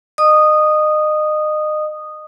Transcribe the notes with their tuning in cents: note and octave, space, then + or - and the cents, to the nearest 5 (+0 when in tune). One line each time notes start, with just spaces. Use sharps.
D#5 -30 D#6 -10